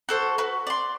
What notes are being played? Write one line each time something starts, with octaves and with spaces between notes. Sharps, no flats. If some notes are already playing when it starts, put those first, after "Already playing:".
F#4 A4 C5
F#4 B4
D5 C6